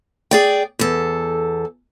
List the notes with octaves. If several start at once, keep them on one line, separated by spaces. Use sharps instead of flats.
G#4 D5 G5
E2 A4